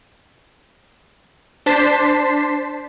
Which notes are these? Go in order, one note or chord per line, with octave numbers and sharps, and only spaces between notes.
D4 C5 A5 B6 C7